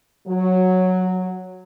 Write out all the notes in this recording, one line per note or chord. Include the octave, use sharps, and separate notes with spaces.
F#3